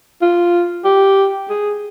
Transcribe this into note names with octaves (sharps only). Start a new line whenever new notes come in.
F4
G4
G#4